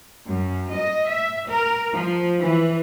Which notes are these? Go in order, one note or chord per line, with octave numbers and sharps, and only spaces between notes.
F#2
D#5
E5
A#4
F3
E3